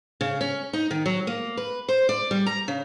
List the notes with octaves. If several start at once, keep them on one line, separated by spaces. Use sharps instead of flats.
C#3
C#4
D#4
D#3
F#3
A#3
B4
C5
D5
G3
A#5
C#3